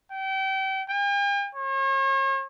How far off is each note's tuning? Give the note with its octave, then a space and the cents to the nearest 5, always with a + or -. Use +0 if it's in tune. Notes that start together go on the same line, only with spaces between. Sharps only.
G5 -30
G5 +45
C#5 -40